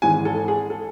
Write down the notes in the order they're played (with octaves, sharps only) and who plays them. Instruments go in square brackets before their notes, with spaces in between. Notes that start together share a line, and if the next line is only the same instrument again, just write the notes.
[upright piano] G#1 G#2 E3 G#3 G#5
A4
G#4
A4